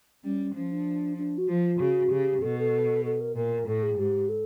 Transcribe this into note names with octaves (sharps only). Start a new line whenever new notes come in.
G3 C#4
F3 C#4
D4
D4
F#4
F3 F4
C#3 F#4
C#3 G4
B2 A4
A4
A4
A#4
A#2 A#4
A2 A4
G#4
G#2 G4
A4